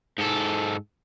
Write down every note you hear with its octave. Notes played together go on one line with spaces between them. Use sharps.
G#2 A4